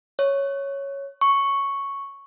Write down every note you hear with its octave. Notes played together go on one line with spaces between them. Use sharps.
C#5
C#6